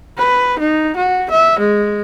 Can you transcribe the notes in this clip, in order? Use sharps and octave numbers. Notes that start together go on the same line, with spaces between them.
B4
D#4
F#4
E5
G#3